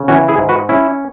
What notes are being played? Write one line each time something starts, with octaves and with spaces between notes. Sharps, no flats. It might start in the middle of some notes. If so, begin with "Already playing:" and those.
Already playing: C#3
E3 C#4 F#4
E4 G#4
G#2
F#4 B4
C#4 E4